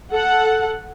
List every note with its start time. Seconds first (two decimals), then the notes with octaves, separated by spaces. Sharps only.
0.10 A4 F#5